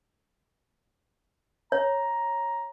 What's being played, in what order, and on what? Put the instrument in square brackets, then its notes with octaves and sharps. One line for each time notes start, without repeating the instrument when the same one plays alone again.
[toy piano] C#5 [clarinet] A#5